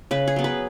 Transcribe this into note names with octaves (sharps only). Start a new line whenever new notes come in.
C#3 B4
G#4
F#3 B3
B4